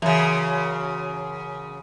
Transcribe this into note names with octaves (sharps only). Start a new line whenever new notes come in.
F#2 C#3 E3